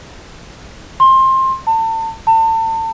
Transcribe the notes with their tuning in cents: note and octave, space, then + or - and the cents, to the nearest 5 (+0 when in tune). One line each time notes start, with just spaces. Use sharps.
C6 +20
A5 +35
A5 +35